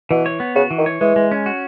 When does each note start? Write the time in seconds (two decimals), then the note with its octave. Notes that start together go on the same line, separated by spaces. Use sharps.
0.10 B2 E3
0.26 C#5
0.40 B3
0.55 C#3 F#4
0.71 E3
0.78 D#3
0.86 C#5
1.00 E3 G#3
1.16 G#3
1.32 C#4
1.46 F#4